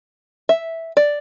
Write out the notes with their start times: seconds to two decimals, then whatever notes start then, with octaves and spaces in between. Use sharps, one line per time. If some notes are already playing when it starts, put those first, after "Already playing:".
0.49 E5
0.97 D5